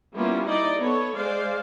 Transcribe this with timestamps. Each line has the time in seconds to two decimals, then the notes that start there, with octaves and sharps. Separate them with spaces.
0.14 G3 A#3 B3 C#4 E4 F4
0.48 D#4 E4 D5 D#5
0.78 B3 A4 C#5
1.16 G#3 C5 D5 F5